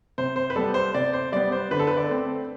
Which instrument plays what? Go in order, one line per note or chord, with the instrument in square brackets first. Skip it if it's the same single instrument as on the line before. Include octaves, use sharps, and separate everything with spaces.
[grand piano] C3 C5
C5
B4
G3 B3 A4
C5
C3 D5
C5
G3 B3 D5
C5
D3 B4
A4
B4
D5
A3 C4